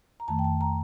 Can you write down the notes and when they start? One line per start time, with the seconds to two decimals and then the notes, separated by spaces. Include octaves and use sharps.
0.20 A#5
0.28 F2 D#3 A3 A5
0.39 G5
0.44 A5
0.61 A#5